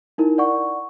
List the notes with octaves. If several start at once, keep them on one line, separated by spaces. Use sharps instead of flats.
D#4 E4 A#4
D5 F#5 C#6